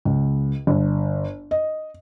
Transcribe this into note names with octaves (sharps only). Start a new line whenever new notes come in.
C#2
G1
D#5